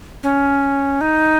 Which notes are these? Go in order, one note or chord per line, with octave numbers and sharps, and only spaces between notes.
C#4
D#4